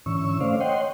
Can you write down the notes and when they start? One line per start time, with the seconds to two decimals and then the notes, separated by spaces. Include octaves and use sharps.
0.06 G#2 D3 E3 C#4 C#6 E6
0.40 A3 C#4 C5 D5 F5
0.60 C#5 D#5 F#5 G5 C6